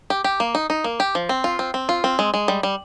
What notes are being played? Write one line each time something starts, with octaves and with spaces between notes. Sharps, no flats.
G4
G4
A#3
D#4
D#4
A#3
G4
F3
C4
F4
C4
C4
F4
C4
G#3
G#3
G3
G3